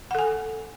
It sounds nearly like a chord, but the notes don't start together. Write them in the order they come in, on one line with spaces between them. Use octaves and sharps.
F#5 A4 G#5